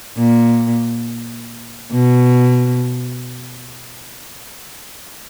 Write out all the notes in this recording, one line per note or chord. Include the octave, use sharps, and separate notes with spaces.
A#2
B2